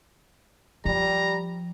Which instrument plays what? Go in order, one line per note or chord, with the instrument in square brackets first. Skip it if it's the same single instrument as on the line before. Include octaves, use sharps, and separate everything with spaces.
[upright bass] F3 [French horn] G3 [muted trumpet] A#5